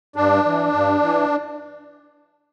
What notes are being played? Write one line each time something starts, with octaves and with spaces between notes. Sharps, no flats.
G2 D4
E3
G2
E3